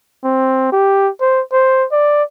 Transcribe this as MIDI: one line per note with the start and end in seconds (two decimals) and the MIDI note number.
0.24 0.71 60
0.72 1.10 67
1.21 1.42 72
1.52 1.86 72
1.92 2.23 74